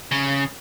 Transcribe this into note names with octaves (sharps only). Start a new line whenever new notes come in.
C#3